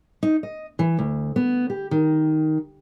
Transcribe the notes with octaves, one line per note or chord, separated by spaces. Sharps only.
D#4
D#5
E3
D2
B3
G4
D#3